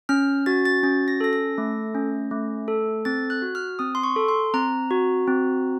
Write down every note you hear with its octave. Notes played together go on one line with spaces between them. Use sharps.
C#4 F6
F#4 A6
A6
C#4 A6
A#6
A4 A#6
A#6
A3
C#4
A3
A4
C4 A6
F#6
F#4
F6
C4 D#6
C6
C#6
A4
C6
C4 A#5
F#4
C4